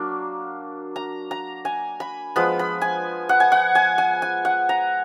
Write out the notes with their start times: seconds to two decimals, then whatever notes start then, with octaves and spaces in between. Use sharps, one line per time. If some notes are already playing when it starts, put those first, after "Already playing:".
Already playing: F#3 A#3 D4
0.96 A#5
1.31 A#5
1.65 G#5
2.00 B5
2.36 F3 G#3 B3 B5
2.59 B5
2.81 G#5
3.29 F#5
3.40 G#5
3.52 F#5
3.75 G#5
3.98 G#5
4.22 G#5
4.45 F#5
4.69 A#5